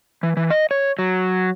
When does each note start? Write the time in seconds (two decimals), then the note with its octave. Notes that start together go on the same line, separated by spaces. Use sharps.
0.23 E3
0.37 E3
0.50 D#5
0.71 C#5
0.99 F#3